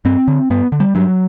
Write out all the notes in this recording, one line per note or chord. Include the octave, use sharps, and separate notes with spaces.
G2 C4
D3
G2 B3
D3
G3
G2 F#3